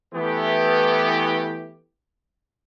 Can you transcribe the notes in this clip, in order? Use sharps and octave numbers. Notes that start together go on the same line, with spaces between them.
E3 A3 B3 G4